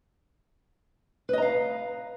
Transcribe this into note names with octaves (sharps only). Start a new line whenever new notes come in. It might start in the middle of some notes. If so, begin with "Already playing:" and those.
B4 D#5 F5 A#5